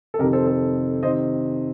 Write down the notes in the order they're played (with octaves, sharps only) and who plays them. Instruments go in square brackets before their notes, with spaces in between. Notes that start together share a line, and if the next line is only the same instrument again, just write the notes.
[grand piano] A4
F2 C3 D#3 G4 A#4
A4 C5
A4 C5
C3 D#3 C5 D#5